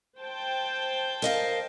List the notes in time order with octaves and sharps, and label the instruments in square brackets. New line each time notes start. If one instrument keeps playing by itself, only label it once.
[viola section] C5 G5 A5
[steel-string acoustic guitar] A#4 D#5 F5